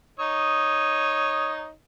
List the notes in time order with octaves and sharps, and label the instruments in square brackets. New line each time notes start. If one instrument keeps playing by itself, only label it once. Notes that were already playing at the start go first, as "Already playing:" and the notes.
[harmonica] D#4 C#5 D#6